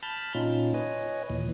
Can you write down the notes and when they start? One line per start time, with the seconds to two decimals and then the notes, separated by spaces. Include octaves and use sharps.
0.03 A5 B5 F6 G6 A6
0.35 A#2 C#4 D#4 F4
0.74 B4 C#5 D#5 G#5
1.30 D#2 A#2 E3